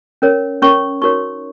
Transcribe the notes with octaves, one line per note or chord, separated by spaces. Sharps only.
C#4 A#4 C#5
C#4 A#4 C#5 C#6
D#4 F#4 A#4 C#5 C#6